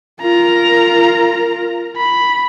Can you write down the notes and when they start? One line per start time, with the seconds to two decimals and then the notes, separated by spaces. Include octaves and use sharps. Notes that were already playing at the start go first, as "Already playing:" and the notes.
0.22 F4 A#4 A#5
1.97 B5